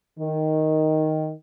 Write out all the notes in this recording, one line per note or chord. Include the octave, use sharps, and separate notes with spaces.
D#3